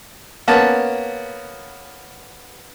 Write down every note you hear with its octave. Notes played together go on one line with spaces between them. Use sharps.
A#3 B3 C#4 A5